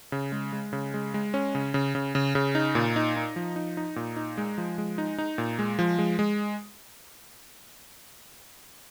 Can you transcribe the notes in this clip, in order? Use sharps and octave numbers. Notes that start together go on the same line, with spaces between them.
C#3
G#3
G#3
C#3
G#3
G#3
C#4
C#3
C#3
C#3
C#3
C#3
D#4
A#2
D#4
D#4
F3
D#4
D#4
A#2
D#4
G#3
F3
G#3
D#4
D#4
A#2
G#3
F3
G#3
G#3